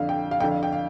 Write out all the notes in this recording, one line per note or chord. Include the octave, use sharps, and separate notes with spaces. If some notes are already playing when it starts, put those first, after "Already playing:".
Already playing: F2 D3 F5
G5
F5
F2 D3 G5
F5
G5
F5